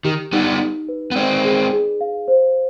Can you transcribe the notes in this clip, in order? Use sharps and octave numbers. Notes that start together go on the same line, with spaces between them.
D#3 G4
G3 B3 D#4
D#4
B4
B3
G#3 C4 D5
G#4
G#4
F5
C5